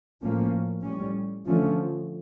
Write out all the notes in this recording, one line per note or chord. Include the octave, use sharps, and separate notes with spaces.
A2 F3 A#3 C#4
A2 G3 C#4
D3 F3 A3 C#4